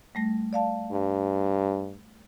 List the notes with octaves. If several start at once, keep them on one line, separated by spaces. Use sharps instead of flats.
G3 A3 A#6
D5 F5 A5
G2